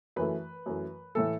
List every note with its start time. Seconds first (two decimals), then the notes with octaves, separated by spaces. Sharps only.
0.16 F#2 E3 A3 B4
0.66 F#2 E3 A3
1.15 A2 E3 A3 A4